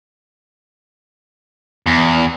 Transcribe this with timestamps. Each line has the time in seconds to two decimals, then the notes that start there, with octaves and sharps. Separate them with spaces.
1.87 E2